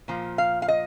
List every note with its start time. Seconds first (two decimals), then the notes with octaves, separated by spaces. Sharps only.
0.08 A#2 F3
0.38 F5
0.62 F5
0.68 D#5